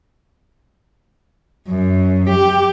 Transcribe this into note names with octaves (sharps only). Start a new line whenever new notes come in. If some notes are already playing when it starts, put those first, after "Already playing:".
F#2
G4